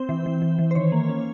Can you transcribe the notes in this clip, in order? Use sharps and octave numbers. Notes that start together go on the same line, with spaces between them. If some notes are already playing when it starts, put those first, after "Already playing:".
Already playing: C4 C5
E3
E3
E3
E3
C5
D#3 C#5
A#3
C#4